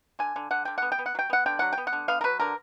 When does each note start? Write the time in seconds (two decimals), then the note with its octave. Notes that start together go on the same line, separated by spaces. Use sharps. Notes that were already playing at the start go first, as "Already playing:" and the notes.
0.19 D3 G#5
0.36 D3
0.51 D3 F#5
0.65 D3 G5
0.78 B3 F#5
0.92 G5
0.98 B3
1.06 F#5
1.15 F#3 G5
1.30 B3 F#5
1.46 D3 G5
1.59 F#3 F#5
1.73 G5
1.78 B3
1.87 F#5
1.93 D3
2.08 B3 F5
2.21 A#4
2.24 F#3 B4
2.40 D3 A#4